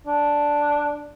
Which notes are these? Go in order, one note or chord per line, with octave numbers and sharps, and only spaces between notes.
D4